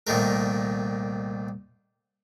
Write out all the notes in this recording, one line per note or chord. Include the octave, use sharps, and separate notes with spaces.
C2 A#2 D#3 A3 A#4